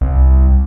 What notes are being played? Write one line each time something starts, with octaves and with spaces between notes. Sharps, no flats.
C2